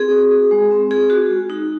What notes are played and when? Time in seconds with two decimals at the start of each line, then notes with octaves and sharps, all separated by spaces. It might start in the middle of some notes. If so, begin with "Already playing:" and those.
Already playing: C4 G#4
0.12 F#4
0.32 F#4
0.51 G#3
0.71 C4
0.91 F4 G#4
1.10 F#4
1.30 G#3
1.50 D#4